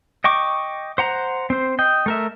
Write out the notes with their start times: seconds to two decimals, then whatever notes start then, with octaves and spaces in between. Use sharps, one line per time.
0.24 D#5 G5 C#6 D6
0.98 C5 F#5 A#5
1.50 C4 C5
1.79 D#5 G5
2.06 A3 A#4 E5